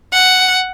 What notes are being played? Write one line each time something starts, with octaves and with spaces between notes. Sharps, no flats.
F#5